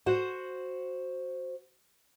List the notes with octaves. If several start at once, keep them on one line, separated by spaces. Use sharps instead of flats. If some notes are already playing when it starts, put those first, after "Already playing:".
F#4 C5 F#5